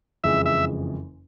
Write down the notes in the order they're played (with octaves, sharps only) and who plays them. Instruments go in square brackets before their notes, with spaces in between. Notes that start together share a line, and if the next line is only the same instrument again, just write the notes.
[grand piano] F#1 F2 C#3 E3 G#3 [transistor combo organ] E5
[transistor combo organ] E5